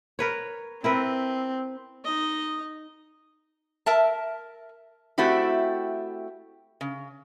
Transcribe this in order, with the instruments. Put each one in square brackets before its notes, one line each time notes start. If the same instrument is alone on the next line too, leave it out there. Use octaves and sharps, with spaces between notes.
[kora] A#4 B4 C#5
[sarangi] C4 [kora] E4 A#4 B4
[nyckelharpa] D#4 D#5
[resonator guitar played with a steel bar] A#4 E5 A5
A3 C4 E4 F#4 G4
C#3